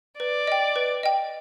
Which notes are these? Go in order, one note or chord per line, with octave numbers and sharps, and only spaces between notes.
B4 D5
D#5 G5
B4
D#5 G5